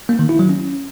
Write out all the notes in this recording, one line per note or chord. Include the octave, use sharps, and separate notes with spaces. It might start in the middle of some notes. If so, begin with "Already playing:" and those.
A#3
D#3
E4
F#3
C#4